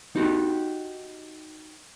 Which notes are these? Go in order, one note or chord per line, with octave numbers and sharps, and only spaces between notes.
D#4 F#4 G4